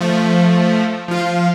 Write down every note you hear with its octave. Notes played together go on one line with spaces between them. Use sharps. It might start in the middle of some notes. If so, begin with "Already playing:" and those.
F3 A3
F3 F4